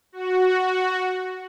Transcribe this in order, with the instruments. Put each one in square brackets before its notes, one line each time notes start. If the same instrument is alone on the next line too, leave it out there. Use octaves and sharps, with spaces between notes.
[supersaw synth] F#4